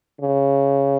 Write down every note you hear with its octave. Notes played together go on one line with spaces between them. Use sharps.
C#3